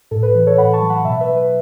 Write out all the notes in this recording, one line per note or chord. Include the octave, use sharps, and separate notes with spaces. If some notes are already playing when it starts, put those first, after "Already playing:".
A2 A4
B4
E3 B4
A4 C#5
A2 F#5 B5
A5 C#6
F#3
F#5 B5
B2 E5 A5
B4 E5
F#3
B4